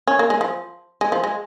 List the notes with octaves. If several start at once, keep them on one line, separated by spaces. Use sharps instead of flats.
C#4
A#3
G#3
F3
G#3
F3
G#3